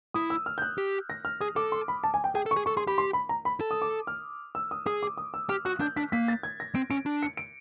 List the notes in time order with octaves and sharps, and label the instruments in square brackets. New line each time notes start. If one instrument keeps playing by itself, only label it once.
[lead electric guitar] E4 [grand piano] D#6
[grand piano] E6
F6
G6
F#6
[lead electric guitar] G4
[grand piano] A#6
F6
[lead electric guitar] G#4 [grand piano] D#6
[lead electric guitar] A4 [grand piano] D6
[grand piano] C6
B5
A5
G#5
G5
[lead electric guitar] G#4 [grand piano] G5
[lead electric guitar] A4
[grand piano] C#6
[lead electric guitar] G#4
[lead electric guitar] A4 [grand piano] C#6
[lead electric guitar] G#4 [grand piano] C6
[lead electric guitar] G4 [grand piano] B5
[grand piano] C6
B5
A#5
B5
[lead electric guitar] A4
[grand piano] D#6
D6
F6
E6
D#6
[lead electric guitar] G#4 [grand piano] D#6
[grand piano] D6
D#6
E6
[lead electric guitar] G4 [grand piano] F6
[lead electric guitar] F#4 [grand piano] F#6
[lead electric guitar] D4 [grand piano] G6
[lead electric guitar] D4 [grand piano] B6
[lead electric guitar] A#3 [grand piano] B6
[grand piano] A6
G#6
A#6
[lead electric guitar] C4 [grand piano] D7
[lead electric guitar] C#4 [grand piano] D7
[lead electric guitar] D4
[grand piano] C#7
D7